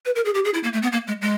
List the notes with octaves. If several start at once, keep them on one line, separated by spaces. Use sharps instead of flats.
B4
A#4
G#4
G4
G#4
E4
A#3
A3
B3
A#3
G#3
G#3